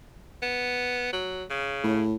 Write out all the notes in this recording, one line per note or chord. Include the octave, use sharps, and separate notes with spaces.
B3
F#3
C#3
A2